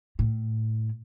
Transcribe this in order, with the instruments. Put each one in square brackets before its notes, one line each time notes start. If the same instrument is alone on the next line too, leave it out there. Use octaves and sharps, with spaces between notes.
[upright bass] A2